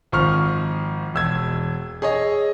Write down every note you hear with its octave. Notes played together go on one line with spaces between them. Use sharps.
G#1 F3 C#6 F6
E1 E6 G#6
G#4 C#5 D#5